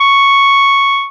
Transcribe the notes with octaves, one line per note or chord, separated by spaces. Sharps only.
C#6